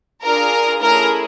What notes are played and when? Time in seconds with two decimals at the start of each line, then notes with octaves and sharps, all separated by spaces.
0.23 D4 F4 G#4 A#4
0.81 A3 C#4 E4 G#4 A#4